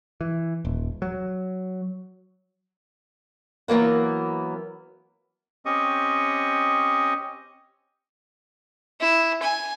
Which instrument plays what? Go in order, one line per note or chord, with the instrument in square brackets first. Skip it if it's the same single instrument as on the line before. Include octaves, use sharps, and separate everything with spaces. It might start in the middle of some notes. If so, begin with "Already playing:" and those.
[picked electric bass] E3
D#1
F#3
[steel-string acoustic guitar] E3 F#3 A#3 B3
[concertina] C4 C#4 G4 D#5 C#6 D#6
[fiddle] E4
G#5